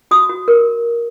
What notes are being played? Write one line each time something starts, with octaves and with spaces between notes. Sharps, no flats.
F#4 D#6
F#4
A#4